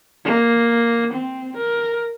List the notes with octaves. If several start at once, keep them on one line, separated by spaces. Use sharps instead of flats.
A#3
C4
A#4